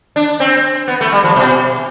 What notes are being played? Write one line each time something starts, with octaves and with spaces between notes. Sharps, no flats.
D4
C4
B3
A3
G3
F3
B2